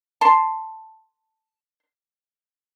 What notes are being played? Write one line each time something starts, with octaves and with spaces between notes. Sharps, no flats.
A5 C6